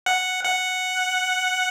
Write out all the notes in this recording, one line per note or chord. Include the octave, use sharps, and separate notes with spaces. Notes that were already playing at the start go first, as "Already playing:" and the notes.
F#5
F#5